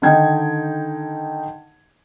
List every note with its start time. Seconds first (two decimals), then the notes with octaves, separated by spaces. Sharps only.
0.02 D3 D#3 D#4 G5 G#6